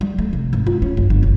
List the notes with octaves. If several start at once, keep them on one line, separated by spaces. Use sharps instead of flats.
G3
A3
C3
G#1
F4
C#4
G1
G1
A#1